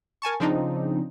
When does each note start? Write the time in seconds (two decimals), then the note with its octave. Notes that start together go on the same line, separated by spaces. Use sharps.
0.22 A#4 G#5 A5 C#6
0.40 C#3 F3 C4 D4 D#4